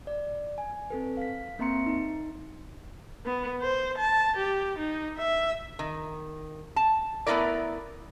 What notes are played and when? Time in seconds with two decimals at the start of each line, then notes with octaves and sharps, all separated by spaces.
0.07 D5
0.58 G#5
0.90 C4 A4 B4
1.17 F5 B6
1.59 A#3 C4 E5 A#5 C6 C#7
1.86 D#4
3.25 B3
3.61 C5
3.98 A5
4.36 G4
4.78 D#4
5.18 E5
5.79 D#3
6.76 A5
7.27 A3 B3 C4 E4 A#4 D5